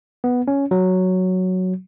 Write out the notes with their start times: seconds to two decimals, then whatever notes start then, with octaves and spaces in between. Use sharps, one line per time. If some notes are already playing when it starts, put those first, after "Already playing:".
0.24 B3
0.48 C#4
0.71 F#3